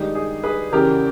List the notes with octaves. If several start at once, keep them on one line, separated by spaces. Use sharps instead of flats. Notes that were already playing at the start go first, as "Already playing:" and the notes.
Already playing: G2 D#3 G#3 D#4 G4
G#4
G#4 B4
E2 C#3 E3 G4 A#4